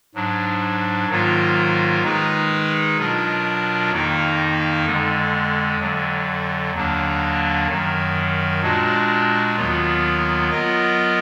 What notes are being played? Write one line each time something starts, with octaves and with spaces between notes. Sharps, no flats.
G#2 F#3 D4
G#2 D#3 F#3 A#3 F4
D#3 G#3 D#4 G#4 B4
B2 F#3 D4 F4 A#4
F2 D#3 A#3 D#4
F2 D3 G#3
F2 D3 F#3
D#2 D3 F#3 A#3 D4
F#2 D#3 F#3
A#2 G#3 D4 F#4
D#2 D#3 F#3 B3 F4
F#3 B3 F4 A#4 D#5